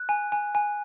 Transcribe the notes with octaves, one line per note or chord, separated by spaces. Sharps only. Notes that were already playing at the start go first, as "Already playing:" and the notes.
Already playing: F#6
G#5
G#5
G#5